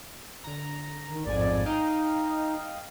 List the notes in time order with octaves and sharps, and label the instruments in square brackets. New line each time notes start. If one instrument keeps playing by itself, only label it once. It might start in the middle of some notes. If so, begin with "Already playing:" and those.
[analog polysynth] D3 A#5
[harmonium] D#3
[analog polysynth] A1 G#2 G#5 [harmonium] F2 D5
[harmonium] D#4 [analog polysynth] D#5 F5 G5